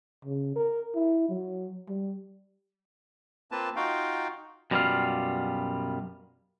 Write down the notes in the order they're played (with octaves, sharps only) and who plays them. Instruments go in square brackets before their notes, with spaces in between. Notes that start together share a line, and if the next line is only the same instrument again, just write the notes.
[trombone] C#3
A#4
E4
F#3
G3
[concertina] A#3 C4 F4 B4 A5
D#4 F4 F#4 F5 G5
[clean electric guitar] F#2 B2 G3 A3 F4 F5